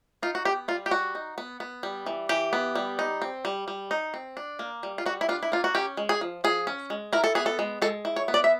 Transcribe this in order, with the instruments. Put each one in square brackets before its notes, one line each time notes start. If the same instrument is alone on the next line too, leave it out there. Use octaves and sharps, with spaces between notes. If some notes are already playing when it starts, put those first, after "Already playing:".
[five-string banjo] D#4 F4
F#4
B3 G4
G3 F4
G4
G3 F#4
D#4
B3
B3
G3
E3
E3 G4
B3
G3
D#4
C4
G3
G3
D#4
C4
D4
A#3
G3
F4
G3 F#4
E4
D4 F4
E4
A#3 F4
F#4
C#4 G4
G#3
G#4
F3
F3 G#4
C#4
G#3
E4 A#4
A4
B3 G#4
A4
G#3
G#3 A4
E4
C#5
B3
D5
E5